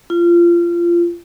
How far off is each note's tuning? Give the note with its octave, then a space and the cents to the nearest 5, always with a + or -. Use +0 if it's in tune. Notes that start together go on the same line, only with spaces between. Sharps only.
F4 -25